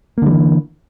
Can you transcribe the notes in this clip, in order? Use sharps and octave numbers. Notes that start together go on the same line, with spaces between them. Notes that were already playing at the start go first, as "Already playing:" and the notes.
D3 E3 G3 A#3